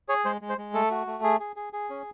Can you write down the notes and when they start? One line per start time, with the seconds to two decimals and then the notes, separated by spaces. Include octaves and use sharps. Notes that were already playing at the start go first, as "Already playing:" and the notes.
0.09 G#4 C#5
0.25 G#3 C5
0.41 G#3
0.49 C5
0.58 G#3
0.73 A3 A4
0.91 F#4
1.07 A3
1.23 G#4
1.40 G#4
1.56 G#4
1.73 G#4
1.90 C#4